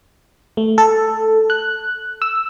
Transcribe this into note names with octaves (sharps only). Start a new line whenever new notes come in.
A3
A4
F#6
E6